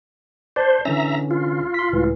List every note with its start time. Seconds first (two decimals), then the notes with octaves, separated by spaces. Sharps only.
0.56 C5 D5 A5
0.85 D3 E3 C#4 E5 A#5
1.31 F4
1.74 C6 B6
1.93 C#2 A2 E3